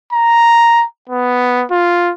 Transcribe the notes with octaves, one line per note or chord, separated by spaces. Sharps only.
A#5
B3
F4